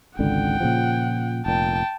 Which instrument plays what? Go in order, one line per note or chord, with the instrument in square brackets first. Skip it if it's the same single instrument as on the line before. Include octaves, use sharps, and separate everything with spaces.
[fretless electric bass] G#1 C#2 D3 [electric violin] F#5 G5
[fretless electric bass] A#2 C#3 F3
[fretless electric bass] F1 A#2 [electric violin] G5 A5